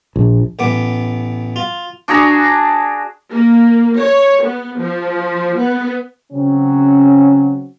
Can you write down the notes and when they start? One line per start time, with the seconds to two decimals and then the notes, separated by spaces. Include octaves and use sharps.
0.16 A#1
0.59 A1 B3 D6
1.56 F4
2.08 D4 F#4 G#4 A#5
3.31 A#3
3.98 C#5
4.43 B3
4.79 F3
5.59 B3
6.32 C#3 F#3 C4 C#4